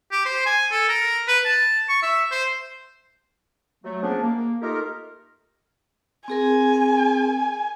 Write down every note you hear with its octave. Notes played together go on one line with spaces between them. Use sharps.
G4
C5
G#5
A4
A#4
B4
A5
C#6
E5
C5
F#3 A3
F3 G#3 A#3 B3 C#4 D4
A#3
A3 D#4 F4 G4 A#4
C4 G#4 A#4 G#5